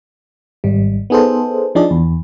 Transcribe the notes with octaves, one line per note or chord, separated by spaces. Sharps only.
G#1 G3
B3 D#4 G#4 A4 C5
F3 D4 D#4 G#4 D5
E2